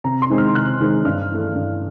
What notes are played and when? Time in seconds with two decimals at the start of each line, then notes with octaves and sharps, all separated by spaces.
0.04 C3 A#5
0.22 C6
0.30 D#3 G#3 C4 D#4
0.38 F6
0.55 C3 F#6
0.80 D#3 G#3 C4 D#4
1.05 G2 F6
1.30 E3 A3
1.55 G2